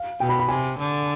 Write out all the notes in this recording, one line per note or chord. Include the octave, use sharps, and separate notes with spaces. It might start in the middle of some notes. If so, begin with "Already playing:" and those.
Already playing: F5
B2 G5
B5
B5
C3 G#5
D3